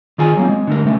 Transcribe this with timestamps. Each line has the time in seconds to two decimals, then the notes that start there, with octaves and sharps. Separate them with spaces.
0.18 D#3 F4 G#4 G#5
0.37 F#3 A#3 C4
0.49 G#3
0.67 D3 A3 A#4
0.85 C3 A3 A#3 C#4